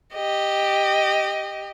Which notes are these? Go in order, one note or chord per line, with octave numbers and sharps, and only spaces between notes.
G4 D#5